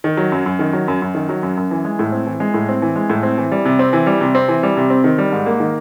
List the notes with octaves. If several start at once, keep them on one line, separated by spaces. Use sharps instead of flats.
D#3
F#3
F#2
F#2
D#3
F#3
F#2
F#2
D#3
F#3
F#2
F#2
E3
G#3
A2
C4
E3
G#3
A2
C4
E3
G#3
A2
C4
E3
G3
C3
C4
E3
G3
C3
C4
E3
G3
C3
C4
D#3
G3
G#2
A#3
D#3